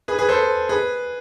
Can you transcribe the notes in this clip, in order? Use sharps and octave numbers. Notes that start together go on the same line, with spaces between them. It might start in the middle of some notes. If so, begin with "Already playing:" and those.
G#4 B4
G#4 B4
A4 C5
G#4 B4